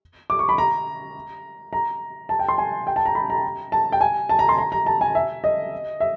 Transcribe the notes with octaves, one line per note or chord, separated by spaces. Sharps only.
D6
C#6
B5
A#5
A#5
A5
G5
C6
G#5
G5
A5
A#5
B5
A#5
A5
G5
G#5
A5
A#5
C6
A#5
A#5
A5
G#5
E5
D#5
E5